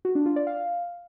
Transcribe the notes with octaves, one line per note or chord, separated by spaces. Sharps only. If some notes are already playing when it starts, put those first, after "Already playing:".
F#4
D4
F4
D5
F5